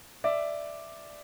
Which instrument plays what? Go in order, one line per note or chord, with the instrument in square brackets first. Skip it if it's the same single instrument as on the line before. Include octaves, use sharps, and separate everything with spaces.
[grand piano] D5 E5